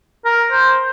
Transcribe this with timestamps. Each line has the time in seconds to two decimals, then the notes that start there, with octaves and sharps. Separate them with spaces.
0.25 A#4
0.52 C5